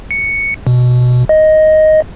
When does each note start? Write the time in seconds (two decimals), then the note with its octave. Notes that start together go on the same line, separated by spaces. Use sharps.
0.11 C#7
0.67 B2
1.29 D#5